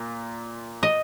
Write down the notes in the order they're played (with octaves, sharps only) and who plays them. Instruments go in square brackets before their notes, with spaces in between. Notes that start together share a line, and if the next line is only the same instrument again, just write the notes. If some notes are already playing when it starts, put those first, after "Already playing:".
Already playing: [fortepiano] A#2 F4
[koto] D#5